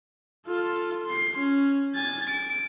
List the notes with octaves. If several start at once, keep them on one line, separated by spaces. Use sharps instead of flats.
F4 A4
C6 C7
C#4
G#5 A6
D7